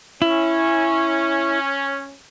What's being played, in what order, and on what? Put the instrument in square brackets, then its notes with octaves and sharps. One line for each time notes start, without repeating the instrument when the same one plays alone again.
[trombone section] C#4 [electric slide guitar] E4